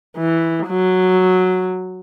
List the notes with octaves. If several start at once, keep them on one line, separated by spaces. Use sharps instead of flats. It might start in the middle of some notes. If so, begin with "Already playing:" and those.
E3
F#3